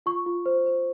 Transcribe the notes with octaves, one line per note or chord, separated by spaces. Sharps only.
F4 C#6
F4
C5
C5